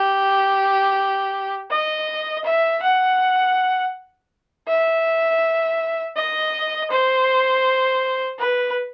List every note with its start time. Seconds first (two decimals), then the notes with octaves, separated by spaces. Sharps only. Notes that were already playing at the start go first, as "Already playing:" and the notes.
Already playing: G4
1.70 D#5
2.44 E5
2.82 F#5
4.68 E5
6.16 D#5
6.90 C5
8.39 B4